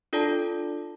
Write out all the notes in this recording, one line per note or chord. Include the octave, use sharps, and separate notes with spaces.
D4 F4 A4 D5 A5